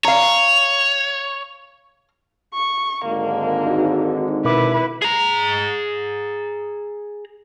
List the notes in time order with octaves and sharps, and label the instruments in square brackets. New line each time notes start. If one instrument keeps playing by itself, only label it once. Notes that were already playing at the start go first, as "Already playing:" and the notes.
[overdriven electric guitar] C#5 [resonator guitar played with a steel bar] F5 A#5
[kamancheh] C#6
[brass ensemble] G#1 G#2 D3 [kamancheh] A#3
[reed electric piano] D#4 F#4
[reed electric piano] B2 A#4 D6 [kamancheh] E4 B4
[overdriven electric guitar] G#4 A#5